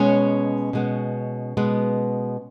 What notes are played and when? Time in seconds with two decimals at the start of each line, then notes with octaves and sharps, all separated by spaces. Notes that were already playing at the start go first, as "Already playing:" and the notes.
Already playing: B2 G#3 B3 C#4 C#5
0.73 B2 G#3 B3
1.57 B2 G#3 B3